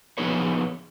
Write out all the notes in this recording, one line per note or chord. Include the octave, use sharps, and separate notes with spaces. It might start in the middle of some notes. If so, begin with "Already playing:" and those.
F3 B3 D#4 G#4 B4 C#5